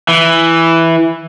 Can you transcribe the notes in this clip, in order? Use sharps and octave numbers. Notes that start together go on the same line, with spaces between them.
E3